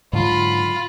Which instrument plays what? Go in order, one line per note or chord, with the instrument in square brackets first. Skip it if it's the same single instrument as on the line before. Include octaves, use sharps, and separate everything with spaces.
[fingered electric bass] G#2 D3 F#3 [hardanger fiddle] F4 B5